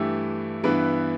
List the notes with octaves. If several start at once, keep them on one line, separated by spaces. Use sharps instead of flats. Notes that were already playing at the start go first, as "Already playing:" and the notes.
Already playing: G2 E3 A3 E4 G4
G2 E3 B3 E4 B4